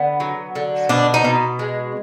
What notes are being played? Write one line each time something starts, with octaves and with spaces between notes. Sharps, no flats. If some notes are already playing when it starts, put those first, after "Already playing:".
Already playing: D3 B3
F#3
D3
B2 D4
D#4
B2
G#3